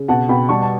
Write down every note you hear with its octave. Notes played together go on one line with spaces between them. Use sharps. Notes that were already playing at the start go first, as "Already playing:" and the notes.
Already playing: C#3
B2 F#5 A5
B2 G5 B5
G3 A5 C#6
A5